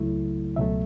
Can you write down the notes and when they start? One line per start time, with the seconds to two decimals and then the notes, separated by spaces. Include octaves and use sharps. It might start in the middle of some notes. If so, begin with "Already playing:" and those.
Already playing: C#2 C#3 F#3 A3 E4
0.56 C#2 B2 F#3 A3 E5